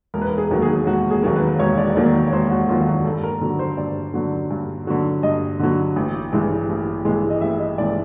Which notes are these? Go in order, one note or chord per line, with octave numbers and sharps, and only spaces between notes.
E1 A#4
B4
A#4
G#4
D#2 D#3 F#3 A#3
G#4
E1 F#4
G#4
D#2 D#3 F#3 A#3
B4
E1 C#5
D5
D#2 D#3 F#3 A#3 D5
C#5
E1 C5
F#4
D#2 D#3 F#3 A#3 F4
F#4
G2 A4
A#4
D3 F#3
C5
G2 D5
D3 F#3
G2
D3 F#3
G2 D#5
D3 F#3
A1
G2 E3 G#3
A1
G2 E3 G#3
D#5
A1 E5
D#5
G2 E3 G#3 D5